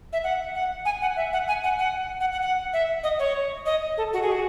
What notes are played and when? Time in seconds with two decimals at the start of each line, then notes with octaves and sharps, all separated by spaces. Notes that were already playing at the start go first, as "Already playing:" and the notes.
0.13 E5
0.24 F#5
0.55 F#5
0.85 G#5
1.02 F#5
1.16 E5
1.33 F#5
1.48 G#5
1.64 F#5
1.79 F#5
2.20 F#5
2.32 F#5
2.42 F#5
2.73 E5
3.03 D#5
3.19 C#5
3.66 D#5
3.98 A4
4.13 F#4
4.22 G#4
4.32 F#4